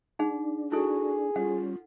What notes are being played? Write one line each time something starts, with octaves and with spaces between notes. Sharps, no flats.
D4 D#4 G#4 F#5
E4 F#4 G#4 A4
G3 C#4 F4 F#5